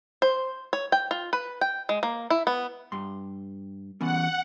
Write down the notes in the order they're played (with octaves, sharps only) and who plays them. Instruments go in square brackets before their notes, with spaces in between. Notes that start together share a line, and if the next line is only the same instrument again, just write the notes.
[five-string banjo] C5
C#5
G5
F4
B4
G5
G#3
A#3
E4
B3
[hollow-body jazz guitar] G2 C6
[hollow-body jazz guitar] E3 B3 C#4 [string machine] F#5